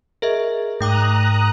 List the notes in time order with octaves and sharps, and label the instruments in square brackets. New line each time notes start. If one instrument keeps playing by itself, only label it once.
[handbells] G#4 D#5 E5 [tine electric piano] A#4
[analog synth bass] G#2 [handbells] A3 G5 D6 [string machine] A#5 D#6 F#6